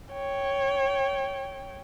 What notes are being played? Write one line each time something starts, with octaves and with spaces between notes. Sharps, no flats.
C#5 G5